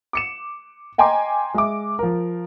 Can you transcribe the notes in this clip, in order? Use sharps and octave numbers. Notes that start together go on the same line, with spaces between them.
D6 C#7 E7
D#5 G5 G#5 A#5 C6 D6
G#3 E5 D6
F3 A#4